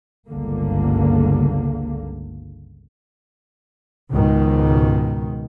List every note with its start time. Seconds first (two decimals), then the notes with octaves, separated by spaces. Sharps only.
0.29 G1 C#2 D3 A#3
4.11 C#2 G#2 B2 D#3